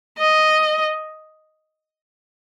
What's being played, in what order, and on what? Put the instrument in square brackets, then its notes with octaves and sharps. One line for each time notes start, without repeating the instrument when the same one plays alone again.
[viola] D#5